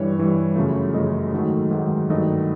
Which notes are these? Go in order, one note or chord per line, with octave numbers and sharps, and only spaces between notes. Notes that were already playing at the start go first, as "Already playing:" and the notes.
Already playing: G2 E3 G3 C#5
G2 E3 G3
F#2 C#3 F3 A3
F#2 C#3 F3 A3 D#5
G#2 D#3 F#3 A3
G#2 D#3 F#3 A3
G2 D#3 F#3 A3 D#5